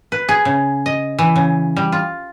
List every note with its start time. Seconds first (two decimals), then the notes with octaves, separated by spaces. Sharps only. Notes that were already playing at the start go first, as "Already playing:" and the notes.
0.12 B4
0.29 G#4
0.45 C#3
0.86 D#5
1.19 E3
1.36 C#3
1.76 G3
1.92 F4